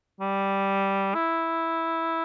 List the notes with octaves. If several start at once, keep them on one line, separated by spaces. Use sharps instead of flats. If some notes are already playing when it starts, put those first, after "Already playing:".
G3
E4